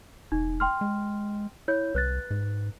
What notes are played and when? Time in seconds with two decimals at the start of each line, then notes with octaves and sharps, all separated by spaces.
0.32 E1 D#4
0.60 G5 C6 F6
0.81 G#3
1.68 E4 C#5 G6
1.95 C2 B4 F#6 A6
2.31 G#2